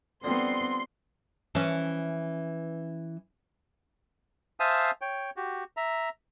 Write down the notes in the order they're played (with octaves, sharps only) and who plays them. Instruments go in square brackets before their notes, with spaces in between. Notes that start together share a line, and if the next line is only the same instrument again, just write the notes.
[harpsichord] D3 F3 G3 [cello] B3 C4 [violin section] C6
[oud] E3 C#4
[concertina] C5 E5 F5 G#5 A5 D#6
C#5 G5
F#4 G4
E5 A#5